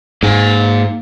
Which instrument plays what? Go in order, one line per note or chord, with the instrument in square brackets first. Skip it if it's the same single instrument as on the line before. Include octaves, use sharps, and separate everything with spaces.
[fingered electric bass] G#2 [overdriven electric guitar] A#3 G#5